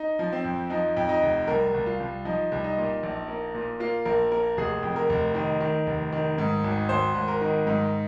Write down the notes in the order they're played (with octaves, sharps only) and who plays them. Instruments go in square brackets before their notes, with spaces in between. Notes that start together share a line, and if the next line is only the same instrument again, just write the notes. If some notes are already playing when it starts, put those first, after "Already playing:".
Already playing: [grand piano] D#4
F3
C4
F2
F3 D#4
F2
D#4
F1
C2 A#4
C2
F4
C2
F3 D#4
C2
D#4
A#2
A#1
A#3
A#2
A#3 F4
A#1 A#4
A#3 A#4
F1 G#4
F2
A#4
F1
D#3
D#3
F1
D#3
G#2
G#1
G#1 C5
G#1
A#4
D#3
G#2